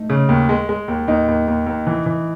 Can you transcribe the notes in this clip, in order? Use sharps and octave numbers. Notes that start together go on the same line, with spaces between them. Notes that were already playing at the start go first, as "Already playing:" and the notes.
Already playing: A3 D#4
C#3
D#2
G#3
G#3
D#2
D#2 D#4
D#2
D#2
D#2
E3
E3